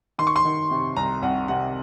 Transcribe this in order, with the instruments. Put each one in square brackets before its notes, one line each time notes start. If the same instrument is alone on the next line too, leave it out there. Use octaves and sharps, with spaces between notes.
[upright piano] D#3 [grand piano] C6
[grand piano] C#6
C6
[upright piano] D#3
C3
[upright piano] C2 [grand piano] A#5
[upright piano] C2 [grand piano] F#5
[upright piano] C3 [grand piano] F#5